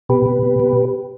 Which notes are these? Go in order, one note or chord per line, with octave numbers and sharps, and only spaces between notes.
B2 G4 B4
B2
B2
B2